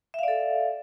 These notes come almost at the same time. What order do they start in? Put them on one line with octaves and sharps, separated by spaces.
E5 F5 D5 A4